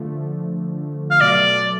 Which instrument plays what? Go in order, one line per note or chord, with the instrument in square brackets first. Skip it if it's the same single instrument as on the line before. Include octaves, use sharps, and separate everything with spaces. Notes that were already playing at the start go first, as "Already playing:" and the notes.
Already playing: [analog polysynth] D3 F3 A3
[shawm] F5
[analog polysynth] B2 F#3 A3 [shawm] D5